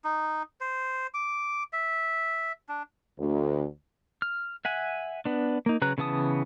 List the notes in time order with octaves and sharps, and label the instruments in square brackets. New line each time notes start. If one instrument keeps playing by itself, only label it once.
[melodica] D#4
C5
D6
E5
D4
[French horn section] D2
[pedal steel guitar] F6
E5 F#5 G#5
B3 D4
A#3 D#4
C#3 F#3 B4 A#5 F#6
C#3 E3 B3 A5 D#6